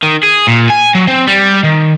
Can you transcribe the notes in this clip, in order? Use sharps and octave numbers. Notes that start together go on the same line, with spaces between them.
D#3
G#4
A#2
G#5
F#3
C4
G3
D#3